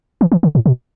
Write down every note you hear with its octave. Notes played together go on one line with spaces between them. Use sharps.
E3
E3
D3
A2
B2